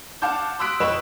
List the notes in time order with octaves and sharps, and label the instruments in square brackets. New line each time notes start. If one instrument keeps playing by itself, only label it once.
[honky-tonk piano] F5 F#5 A5 D6 G6
C6 D#6 E6 F#6 B6 D7
F2 B4 C#5 D#5 E7